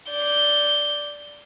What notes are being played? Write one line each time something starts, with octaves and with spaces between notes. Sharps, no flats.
D5 G6